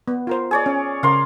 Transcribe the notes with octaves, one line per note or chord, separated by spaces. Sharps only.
B3
F4 A#4 C5
G#4 C#5 D5
C#4
C#3 A#4 F5 C6